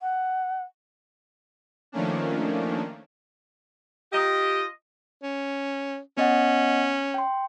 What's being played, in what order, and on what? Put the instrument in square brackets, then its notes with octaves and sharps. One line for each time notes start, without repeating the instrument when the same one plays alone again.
[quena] F#5
[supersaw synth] D#3 F3 A3 A#3 C#4 D4
[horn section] F4 D#5 [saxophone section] G4
[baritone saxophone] C#4
[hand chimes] B3 D#5 F#5 [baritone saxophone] C#4
[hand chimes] G5 C6